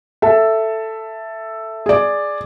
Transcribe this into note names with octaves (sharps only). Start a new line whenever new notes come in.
A4 E5
G#4 D5